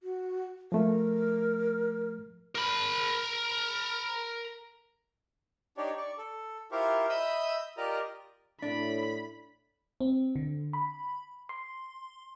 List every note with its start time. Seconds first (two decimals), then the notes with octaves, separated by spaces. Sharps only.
0.03 F#4
0.72 F3 A3 A#4
2.55 A#4 B5
5.77 D4 D#4 G4 C#5 D5
5.97 D5 C#6
6.18 A4
6.72 E4 F4 G4 A#4 C5 C#6
7.09 D#5 E5 B5 D#6 E6 G6
7.77 F4 G4 A#4 D5 D#5 A#5
8.62 A2 D4 B5
10.01 C4
10.36 D3
10.73 B5
11.49 C6